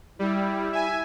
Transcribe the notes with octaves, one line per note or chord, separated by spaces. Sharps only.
G3 E4
E5 G#5